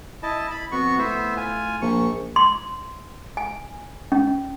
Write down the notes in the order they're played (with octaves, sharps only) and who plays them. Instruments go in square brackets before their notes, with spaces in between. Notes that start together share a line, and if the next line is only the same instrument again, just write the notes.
[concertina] E4 D#5 A5
B5
[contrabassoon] F2 [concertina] B3 F#4 C#6
[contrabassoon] A2 [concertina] B3 C5 E5
[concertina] F4 G#5
[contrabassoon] A#1 [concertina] C#6
[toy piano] C6
G#5
C#4